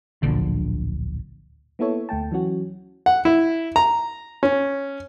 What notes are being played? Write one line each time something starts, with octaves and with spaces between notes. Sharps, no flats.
D1 A#1 D3
A#3 B3 E4 A4 C#5
D2 A3 G5 A5
E3 F#3 C#4 F#4
F#5
E4
A#5
C#4